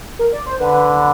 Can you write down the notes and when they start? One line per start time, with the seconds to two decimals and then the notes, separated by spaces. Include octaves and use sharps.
0.19 A#4
0.33 D5
0.46 C5
0.60 D3 B4